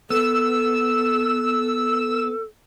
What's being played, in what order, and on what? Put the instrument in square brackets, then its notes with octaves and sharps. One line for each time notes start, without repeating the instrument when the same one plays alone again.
[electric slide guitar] B3 [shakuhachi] A4 [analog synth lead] E6